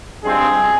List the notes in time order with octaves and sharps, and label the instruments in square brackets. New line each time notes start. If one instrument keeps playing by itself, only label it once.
[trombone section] G2 F3 G#3 C4 G#4